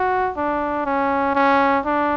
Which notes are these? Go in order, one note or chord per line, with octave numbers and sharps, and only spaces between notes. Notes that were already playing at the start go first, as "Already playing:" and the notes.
Already playing: F#4
D4
C#4
C#4
D4